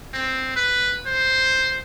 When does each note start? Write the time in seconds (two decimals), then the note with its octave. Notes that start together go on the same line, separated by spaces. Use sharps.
0.13 C4
0.56 B4
1.06 C5